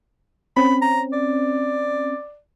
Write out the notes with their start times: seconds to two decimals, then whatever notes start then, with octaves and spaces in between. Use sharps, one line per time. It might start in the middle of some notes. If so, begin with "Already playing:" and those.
0.57 C4 C#4 B5
0.82 A#5
1.13 D5